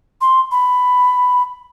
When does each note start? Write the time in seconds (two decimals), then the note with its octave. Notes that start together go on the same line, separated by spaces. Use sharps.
0.21 C6
0.52 B5